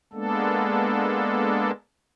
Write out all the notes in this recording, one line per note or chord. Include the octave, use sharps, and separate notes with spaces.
G#3 A#3 B3 D4 A4